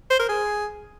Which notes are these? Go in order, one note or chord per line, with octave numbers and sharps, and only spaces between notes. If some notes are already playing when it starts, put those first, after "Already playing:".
C5
A#4
G#4